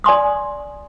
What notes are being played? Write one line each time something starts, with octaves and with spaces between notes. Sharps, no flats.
D5 G#5 C6 D#6